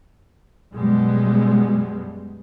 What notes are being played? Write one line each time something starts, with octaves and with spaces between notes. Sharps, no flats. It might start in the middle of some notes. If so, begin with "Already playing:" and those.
F#2 B2 G3 G#3